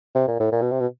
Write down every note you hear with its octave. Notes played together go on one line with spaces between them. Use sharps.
C3
A#2
A2
A#2
B2
C3
B2